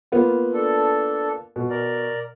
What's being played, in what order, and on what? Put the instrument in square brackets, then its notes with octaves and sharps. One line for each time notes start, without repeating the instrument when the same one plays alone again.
[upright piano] A#3 B3 F4
[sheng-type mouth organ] D4 A4
[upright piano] B2
[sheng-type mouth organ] A#4 D5